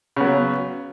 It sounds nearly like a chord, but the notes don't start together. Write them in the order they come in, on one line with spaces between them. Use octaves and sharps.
C#3 B3 F#3